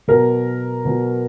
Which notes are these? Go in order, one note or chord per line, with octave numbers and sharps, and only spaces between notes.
B2 F#3 A#4
B2 F#3